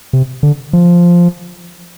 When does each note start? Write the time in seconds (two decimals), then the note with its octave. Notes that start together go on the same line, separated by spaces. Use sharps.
0.13 C3
0.43 D3
0.73 F3